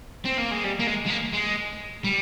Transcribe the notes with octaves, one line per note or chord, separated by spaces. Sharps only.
C4
A#3
G#3
G3
A#3
G#3
G#3
A#3
G#3
G3